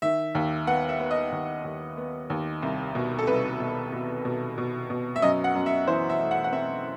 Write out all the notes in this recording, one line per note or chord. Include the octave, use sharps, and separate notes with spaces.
D#3 E5
D#2
B3 F#5
E5
B3
D#5
D#2
D#2
B3
D#2
C2
B2
A4
C2 B4
B2
B2
B2
B2
B2
E5
F#2 D#5
F#5
F#2
E5
E3 C5
E5
A3
F#5
F#5
C4 E5